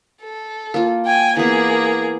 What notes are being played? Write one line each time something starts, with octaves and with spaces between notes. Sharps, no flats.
A4
A#3 F4
G5 G#5
E3 A#3 B3 G#4